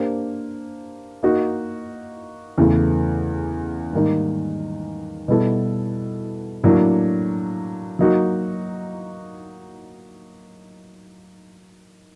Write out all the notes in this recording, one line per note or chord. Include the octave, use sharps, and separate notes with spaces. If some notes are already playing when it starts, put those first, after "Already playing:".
Already playing: A#3 D4 G4 C5
A#3 D#4 F#4
E2 C#3 E3 A3
G#2 D#3 G3 A#3 D#4
B2 G3 B3 E4 A4
A2 F#3 A#3 D4
F#3 A#3 D#4 F#4